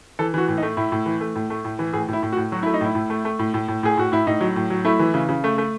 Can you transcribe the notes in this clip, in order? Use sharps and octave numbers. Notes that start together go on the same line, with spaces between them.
E3 A4
E3 F#4
A2
D#4
A3
A2 E4
A2
E3
A3
A2
A3
A2
E3
A2 G#4
A2 E4
A2
F#4
A2
F#3 F#4
A3 E4
D#4
A2 E4
A2
A3
A3
A2
A2
A2
A2 G#4
A2 F#4
A2 E4
A2 D#4
F#3
A2
F#3
A3 E4
E3
C#3
C#3
A3
A3